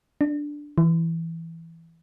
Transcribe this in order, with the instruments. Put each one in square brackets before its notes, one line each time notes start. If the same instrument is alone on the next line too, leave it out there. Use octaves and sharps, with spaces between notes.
[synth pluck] D4
E3